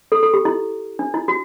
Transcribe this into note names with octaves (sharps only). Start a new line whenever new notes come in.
A4
A4
G4
E4
D4
E4
F#4